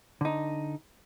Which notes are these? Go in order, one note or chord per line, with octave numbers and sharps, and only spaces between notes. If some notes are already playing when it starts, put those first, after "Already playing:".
D3 D#4